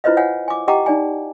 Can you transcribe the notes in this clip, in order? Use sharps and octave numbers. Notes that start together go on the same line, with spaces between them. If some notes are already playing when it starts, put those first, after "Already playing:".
E4 F4 B4 C5 D#5 F5
C#5 F5 F#5 G#5
G#5 D6
G4 D#5 F#5 G5 A#5 D6
D#4 D5 G#5